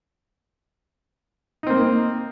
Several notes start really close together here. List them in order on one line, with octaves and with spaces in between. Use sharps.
D#4 C4 A#3